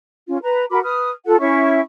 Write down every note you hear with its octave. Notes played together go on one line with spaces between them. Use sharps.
C#4 F4
B4 A#5
F#4 A#4 B5 D6
B4 D#6 F6
F4 A4 F#5
C#4 E4 E5 C#6